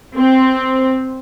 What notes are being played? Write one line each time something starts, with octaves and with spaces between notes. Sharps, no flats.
C4